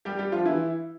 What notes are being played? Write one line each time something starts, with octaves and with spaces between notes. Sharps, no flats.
G3 G4
G3 G4
F3 F4
E3 E4